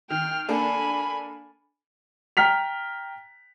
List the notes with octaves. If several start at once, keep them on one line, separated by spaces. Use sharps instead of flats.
D#3 G5 F6
A#3 D4 A4 G#5 B5
G5 A#5 F6 B6 F7